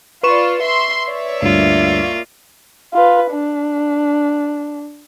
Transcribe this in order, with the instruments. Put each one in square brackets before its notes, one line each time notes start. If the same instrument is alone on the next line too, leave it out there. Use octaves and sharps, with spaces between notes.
[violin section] F4 D5 [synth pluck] B4 C#6 E7
[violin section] E5 C6
C#5 D5 E5
[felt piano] D2 G2 [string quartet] A#3 F4
[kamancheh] F4 B4
D4